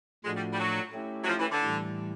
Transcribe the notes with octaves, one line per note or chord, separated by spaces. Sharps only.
A2 F3 G#3 A3 D4 F#4
G3
G3
F#3
A3 C#4 E4 G4
F#3
F3
E3
D3
A2 E3 G3